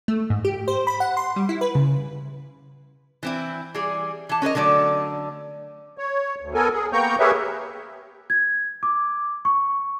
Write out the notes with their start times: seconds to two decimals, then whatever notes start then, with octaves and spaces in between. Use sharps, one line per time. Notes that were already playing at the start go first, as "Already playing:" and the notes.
0.08 A3
0.30 G#2
0.45 G4
0.68 C5
0.87 B5
1.00 F#5
1.17 C6
1.36 G3
1.49 E4
1.61 B4
1.75 C#3
3.23 E3 C4 E4
3.75 E3 G3 G#4
4.29 E3 A5
4.42 C#4 A#4 B4 D#5
4.55 D3 F#3 A3 D5
5.98 C#5
6.41 D2
6.54 B3 A4 A#4 G#5
6.73 G#4
6.93 A#3 B3 G5 A#5 C#6 G6
7.20 G4 G#4 A#4 B4 C#5 E5
8.30 G#6
8.83 D6
9.45 C#6